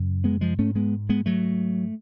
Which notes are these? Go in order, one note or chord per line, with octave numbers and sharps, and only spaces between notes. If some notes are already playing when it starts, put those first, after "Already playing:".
Already playing: F#2 C#3
G#3 B3
F3 G#3
G#2 A3 C#4
G#3 B3
G#3 B3
F#3 A3